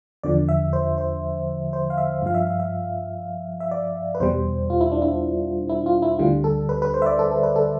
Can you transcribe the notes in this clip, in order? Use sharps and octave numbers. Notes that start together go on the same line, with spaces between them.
E2 D3 F3 D5
E5
C5
C5
C5
F5
E5
G2 F3 F5
E5
F5
E5
E5
D5
B4
E2 B2 G3 C5
F4
E4
D4
E4
E4
F4
E4
D2 D3 G3 F4
A4
B4
B4
C5
E5
D5
A4
A4
B4
A4